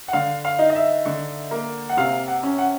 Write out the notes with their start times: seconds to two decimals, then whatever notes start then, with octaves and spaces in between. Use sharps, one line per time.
0.08 F#5
0.13 D3 F5
0.45 F5
0.59 D#4
0.69 D#5
0.75 E5
1.05 D3
1.51 A#3
1.89 F#5
1.97 C3 F5
2.28 F#5
2.43 C#4
2.58 F#5